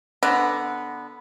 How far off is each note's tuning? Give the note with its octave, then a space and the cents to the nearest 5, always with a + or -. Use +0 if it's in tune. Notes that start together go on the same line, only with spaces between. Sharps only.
D3 +0 B3 -5 A#5 +0